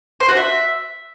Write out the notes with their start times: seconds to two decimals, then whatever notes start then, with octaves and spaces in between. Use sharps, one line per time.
0.20 C5
0.29 F#4
0.37 E5